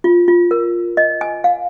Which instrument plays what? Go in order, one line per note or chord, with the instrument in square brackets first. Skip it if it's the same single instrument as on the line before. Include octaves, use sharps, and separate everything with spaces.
[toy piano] F4
F4
A#4
D#5
G#5
F5